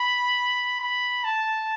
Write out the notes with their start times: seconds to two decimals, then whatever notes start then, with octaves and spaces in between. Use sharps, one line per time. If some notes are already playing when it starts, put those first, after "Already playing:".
Already playing: B5
0.80 B5
1.24 A5